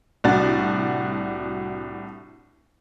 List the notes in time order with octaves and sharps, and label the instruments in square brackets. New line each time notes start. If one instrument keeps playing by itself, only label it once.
[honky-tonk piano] C2 A2 D4 F#4 A6